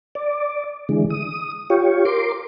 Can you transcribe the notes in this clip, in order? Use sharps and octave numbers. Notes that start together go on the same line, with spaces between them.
D5
D3 E3 G#3
D#6
F4 G4 C#5
A#4 C6 D6